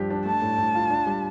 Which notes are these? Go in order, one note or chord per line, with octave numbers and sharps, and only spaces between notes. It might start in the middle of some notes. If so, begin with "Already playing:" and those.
Already playing: G2 F3 G4
D4
A3 A5
A2
A2
F4
D4
G3